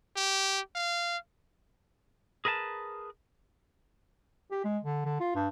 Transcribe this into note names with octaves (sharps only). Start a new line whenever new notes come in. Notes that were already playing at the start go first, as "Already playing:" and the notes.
G4
F5
G#4 A#4 B4 E5 A5
G4
G#3
D3
D3
F4
G2